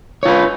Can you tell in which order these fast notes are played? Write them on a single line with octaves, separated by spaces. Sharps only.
C#5 F4 B4